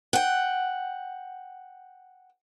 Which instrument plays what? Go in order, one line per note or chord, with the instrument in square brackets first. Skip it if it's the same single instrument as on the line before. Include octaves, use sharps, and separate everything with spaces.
[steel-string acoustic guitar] F#5 G5